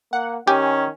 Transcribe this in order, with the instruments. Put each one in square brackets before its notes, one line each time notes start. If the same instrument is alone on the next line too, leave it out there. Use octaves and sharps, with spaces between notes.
[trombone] A#3 [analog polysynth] F#5
[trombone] D#3 [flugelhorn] C#4 [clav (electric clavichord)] G4 [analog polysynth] G#5